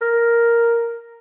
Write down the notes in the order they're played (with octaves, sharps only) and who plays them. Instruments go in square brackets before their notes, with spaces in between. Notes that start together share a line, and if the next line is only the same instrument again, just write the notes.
[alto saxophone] A#4